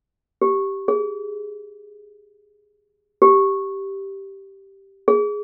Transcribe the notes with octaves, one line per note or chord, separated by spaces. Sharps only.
G4
G#4
G4
G#4